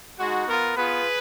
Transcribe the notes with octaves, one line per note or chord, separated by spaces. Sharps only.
G#3 D#4 F#4
B3 F4 A#4
B3 F4 G#4 B4